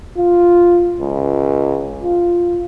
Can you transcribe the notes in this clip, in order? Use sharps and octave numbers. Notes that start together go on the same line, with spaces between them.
F4
C#2
F4